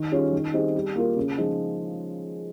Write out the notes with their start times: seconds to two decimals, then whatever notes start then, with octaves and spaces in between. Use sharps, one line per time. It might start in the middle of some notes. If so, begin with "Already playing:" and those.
Already playing: D#3
0.12 G3 C#4 F4 G#4
0.33 D#3
0.54 G3 C4 D#4 G#4
0.75 G3
0.96 A#3 F4 A#4
1.17 C#3
1.38 F3 G#3 D#4